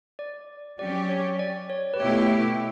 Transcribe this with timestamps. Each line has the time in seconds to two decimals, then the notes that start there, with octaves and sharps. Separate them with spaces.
0.19 D5
0.79 F#3 C#4 G4 D5
0.96 D5
1.09 C#5
1.39 D5
1.70 C#5
1.94 B4
2.00 B2 A3 E4 G4 C#5